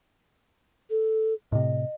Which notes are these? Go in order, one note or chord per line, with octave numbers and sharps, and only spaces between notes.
A4
A2 C3 D#5